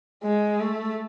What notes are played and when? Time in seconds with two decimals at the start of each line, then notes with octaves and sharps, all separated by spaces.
0.23 G#3
0.60 A3